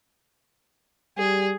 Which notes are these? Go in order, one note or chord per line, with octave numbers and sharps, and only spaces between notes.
G3 G#4